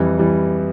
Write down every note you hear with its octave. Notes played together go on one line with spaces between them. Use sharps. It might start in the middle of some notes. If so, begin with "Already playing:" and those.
Already playing: F2 E3 G3
E3 G3